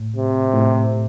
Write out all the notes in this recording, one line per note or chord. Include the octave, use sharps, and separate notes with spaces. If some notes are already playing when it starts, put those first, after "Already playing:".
Already playing: A2
C3
A2